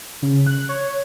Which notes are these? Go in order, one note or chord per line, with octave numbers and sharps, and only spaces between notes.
C#3
F#6
C#5